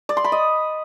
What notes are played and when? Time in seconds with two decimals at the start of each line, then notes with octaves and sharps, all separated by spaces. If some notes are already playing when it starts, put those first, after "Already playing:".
0.09 D5
0.17 C6
0.24 B5
0.32 D#5